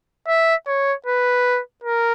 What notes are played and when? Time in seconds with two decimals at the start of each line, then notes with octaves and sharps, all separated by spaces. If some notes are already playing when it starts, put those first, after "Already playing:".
0.28 E5
0.67 C#5
1.06 B4
1.83 A#4